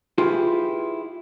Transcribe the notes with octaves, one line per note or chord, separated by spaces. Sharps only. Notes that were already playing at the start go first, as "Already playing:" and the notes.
E4 F4 G4 G#4 B4